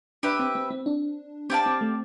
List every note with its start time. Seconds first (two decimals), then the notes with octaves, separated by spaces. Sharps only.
0.23 D4 G4 B4 E5
0.39 C4
0.55 C4
0.71 C4
0.86 D4
1.50 C4 G4 D5 F5 A5
1.66 C4
1.81 A3